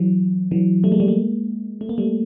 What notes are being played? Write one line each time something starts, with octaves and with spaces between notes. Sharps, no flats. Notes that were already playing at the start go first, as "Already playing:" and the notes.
Already playing: E3 F#3
E3 F#3
G3 A3
G#3 A#3
G3 A3
G#3 A#3
A3
A#3
G3 A3